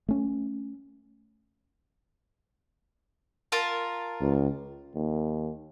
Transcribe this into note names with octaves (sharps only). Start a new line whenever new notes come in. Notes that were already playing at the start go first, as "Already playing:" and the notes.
A3 C#4
F4 A#4 A5
C#2
D#2